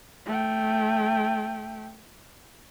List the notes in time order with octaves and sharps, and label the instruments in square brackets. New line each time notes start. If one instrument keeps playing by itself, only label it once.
[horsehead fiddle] A3 G5